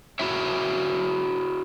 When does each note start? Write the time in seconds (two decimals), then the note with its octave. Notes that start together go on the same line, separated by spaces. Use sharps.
0.19 E4 F#4 A#4 C#5 E5